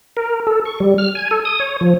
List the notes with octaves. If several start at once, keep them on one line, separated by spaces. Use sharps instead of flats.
A#4
A4
C#6
G3
F6
G#5
A4
D#6
C#5
F3